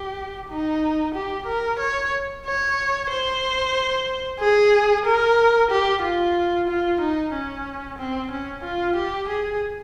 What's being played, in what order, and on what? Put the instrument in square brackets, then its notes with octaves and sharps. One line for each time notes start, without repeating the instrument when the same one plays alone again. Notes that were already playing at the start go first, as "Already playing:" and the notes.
Already playing: [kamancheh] G4
D#4
G4
A#4
C#5
C#5
C5
G#4
A#4
G4
F4
F4
D#4
C#4
C4
C#4
F4
G4
G#4